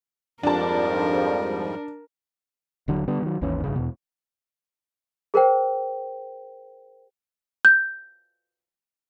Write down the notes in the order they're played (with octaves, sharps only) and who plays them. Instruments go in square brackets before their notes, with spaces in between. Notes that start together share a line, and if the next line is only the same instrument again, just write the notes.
[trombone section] F2 [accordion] G#2 F3 G3 [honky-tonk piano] D4 A5 [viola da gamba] A#4
[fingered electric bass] D#1 D3 F#3
D3 G3 B3
D#3 F#3
G#1 D#2 E3 C#4
A1 G2 C#3
E2 B2
[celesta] G#4 A#4 C5 G5
[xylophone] G6